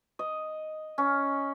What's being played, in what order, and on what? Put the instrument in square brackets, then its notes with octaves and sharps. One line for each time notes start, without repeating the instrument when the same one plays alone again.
[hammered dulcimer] D#5
C#4